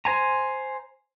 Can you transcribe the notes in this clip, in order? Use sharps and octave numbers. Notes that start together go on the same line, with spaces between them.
C5 G#5 A#5